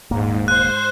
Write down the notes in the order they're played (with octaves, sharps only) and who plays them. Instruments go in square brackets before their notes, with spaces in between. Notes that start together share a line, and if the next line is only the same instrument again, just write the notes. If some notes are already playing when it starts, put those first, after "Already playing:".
[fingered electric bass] D#1 A#3 [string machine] G#2
[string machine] C5 [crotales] F#6